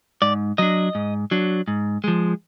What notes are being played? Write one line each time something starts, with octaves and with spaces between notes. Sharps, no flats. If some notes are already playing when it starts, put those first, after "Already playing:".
G#2 D5
F#3 D4 D#5
G#2
F#3 D4
G#2
F3 G#3